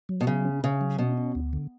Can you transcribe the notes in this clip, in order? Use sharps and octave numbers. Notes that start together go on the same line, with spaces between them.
F#3
B2
C#3 F#3
C#4
C#3 C#4
F#3
B2 C#4
C#4
D2
D3